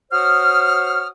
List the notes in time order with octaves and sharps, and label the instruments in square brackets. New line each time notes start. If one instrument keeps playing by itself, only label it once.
[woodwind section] F#4 C5 C#5 D#6 F6